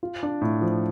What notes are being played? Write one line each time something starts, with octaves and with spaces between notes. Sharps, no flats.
F4
D4
A2
F3